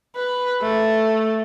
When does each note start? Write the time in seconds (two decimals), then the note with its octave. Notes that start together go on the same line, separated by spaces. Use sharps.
0.16 B4
0.61 A3